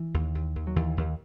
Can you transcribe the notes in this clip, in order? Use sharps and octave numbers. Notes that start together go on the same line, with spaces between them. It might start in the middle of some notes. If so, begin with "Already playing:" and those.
Already playing: E3
D#2
D#2
D#2
F#3
D#2 E3
D#2